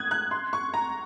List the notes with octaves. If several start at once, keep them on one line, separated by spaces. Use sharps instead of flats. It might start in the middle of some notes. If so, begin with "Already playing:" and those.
Already playing: D#6 F#6 G#6
F#6
C6
C#6
A#5